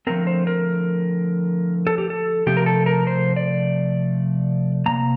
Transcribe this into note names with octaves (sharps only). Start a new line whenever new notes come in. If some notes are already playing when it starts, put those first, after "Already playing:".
D3 F3 A3 C4 A#4
C5
A#4
A4
G4
A4
C3 F3 A3 C4 G4
A#4
A4
A#4
C5
D5
C3 D#3 A#3 A#5